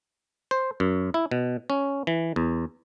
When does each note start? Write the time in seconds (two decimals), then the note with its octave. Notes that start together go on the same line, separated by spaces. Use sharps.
0.51 C5
0.80 F#2
1.14 E4
1.31 B2
1.70 C#4
2.07 E3
2.36 E2